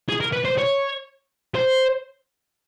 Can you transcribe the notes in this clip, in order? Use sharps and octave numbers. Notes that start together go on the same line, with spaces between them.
G#4
A#4
B4
C5
C#5
C5